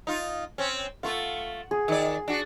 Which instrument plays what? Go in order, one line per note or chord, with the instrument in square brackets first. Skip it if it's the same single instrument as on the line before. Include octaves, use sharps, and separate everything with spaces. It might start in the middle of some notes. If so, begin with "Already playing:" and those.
[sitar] D#4 F4
C4 C#4
[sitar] A3 F4 [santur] F#5 C#6
[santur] G#4
[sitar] D#3 D5
D4 F#4